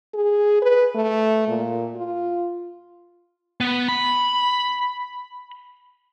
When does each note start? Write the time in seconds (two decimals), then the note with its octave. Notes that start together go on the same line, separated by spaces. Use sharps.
0.14 G#4
0.62 B4
0.95 A3
1.48 A#2
1.96 F4
3.61 B3
3.89 B5